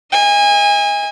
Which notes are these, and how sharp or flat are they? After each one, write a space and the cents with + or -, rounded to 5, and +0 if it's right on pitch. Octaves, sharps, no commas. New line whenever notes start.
D#5 +40 G#5 -30